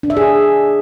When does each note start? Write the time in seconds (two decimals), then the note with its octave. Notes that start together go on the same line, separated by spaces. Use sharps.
0.03 D4
0.10 E5
0.17 G#4